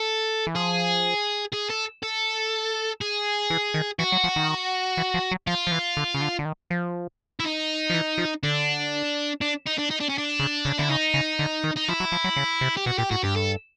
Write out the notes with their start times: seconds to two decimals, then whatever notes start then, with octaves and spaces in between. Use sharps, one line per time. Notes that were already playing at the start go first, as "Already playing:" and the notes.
Already playing: A4
0.47 E3
0.55 F3 G#4
1.53 G#4
1.69 A4
2.03 A4
3.01 G#4
3.50 E3
3.74 D#3
3.99 E3 F#4
4.12 F#3
4.24 F3
4.36 D#3
4.97 E3
5.14 F3
5.31 F#3
5.47 F3 F4
5.67 F3
5.71 E3
5.97 D3
6.15 C#3
6.21 D3
6.39 D3
6.45 D#3
6.70 F3
7.40 E4
7.44 D#4
7.90 F3
7.94 E3
8.18 F3
8.43 D3 D4
9.41 D4
9.67 D#4
9.79 D4
9.91 D#4
10.00 D4
10.09 C#4
10.18 D4
10.39 C#3
10.65 C#3
10.78 D3 E4
10.89 C#3 D#4
11.14 C#3
11.39 D3
11.64 D#3
11.76 D#4
11.88 F3 E4
12.00 F#3
12.12 F3
12.24 F#3
12.37 C#3
12.61 C3
12.77 G4
12.86 B2 F#4
12.98 A#2 G4
13.11 A2 F#4
13.23 G2 G4
13.36 A4